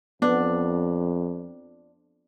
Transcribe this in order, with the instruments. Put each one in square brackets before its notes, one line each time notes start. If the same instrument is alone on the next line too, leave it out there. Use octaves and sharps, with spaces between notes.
[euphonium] F2 [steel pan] B3 [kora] D4